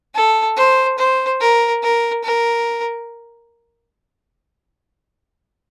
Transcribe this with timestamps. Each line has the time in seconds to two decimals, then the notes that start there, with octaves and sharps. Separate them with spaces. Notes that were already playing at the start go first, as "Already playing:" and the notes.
0.14 A4
0.56 C5
0.98 C5
1.40 A#4
1.82 A#4
2.24 A#4